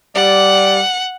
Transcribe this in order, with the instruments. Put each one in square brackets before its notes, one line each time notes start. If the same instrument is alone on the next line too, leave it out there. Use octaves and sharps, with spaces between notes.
[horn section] G3 D5 [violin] F#5